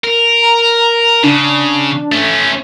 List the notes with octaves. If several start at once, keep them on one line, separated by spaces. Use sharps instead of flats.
A#4
A#5
C#3 D4
A3 C#4